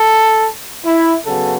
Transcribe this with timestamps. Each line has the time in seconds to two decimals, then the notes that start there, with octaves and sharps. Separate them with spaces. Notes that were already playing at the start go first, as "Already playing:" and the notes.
Already playing: A4
0.85 E4
1.26 C#3 F#3 B3 A4